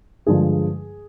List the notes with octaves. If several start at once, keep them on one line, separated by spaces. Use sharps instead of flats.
G2 D3 F3 G#3 G#4